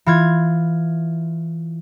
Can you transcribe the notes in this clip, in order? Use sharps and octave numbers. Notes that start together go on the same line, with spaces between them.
E3 F4 G#6